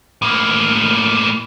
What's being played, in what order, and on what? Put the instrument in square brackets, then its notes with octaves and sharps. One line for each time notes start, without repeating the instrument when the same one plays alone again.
[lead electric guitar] A2 A#3